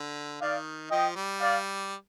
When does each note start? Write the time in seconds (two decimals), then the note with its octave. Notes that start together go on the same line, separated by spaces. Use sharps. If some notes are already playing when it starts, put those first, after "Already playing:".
Already playing: D3
0.41 D#3 D5 F5
0.91 F3 D#5 G5
1.15 G3
1.40 D5 F5